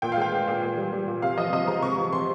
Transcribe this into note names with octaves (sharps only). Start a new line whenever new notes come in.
A#2 G5
F5
G#3 G5
G#3
A#2
A#2
G3
G3
A#2
C3 F5
F3 D#5
C3 D#5
G#3 A#5
C3 C#6
F3
C3 C6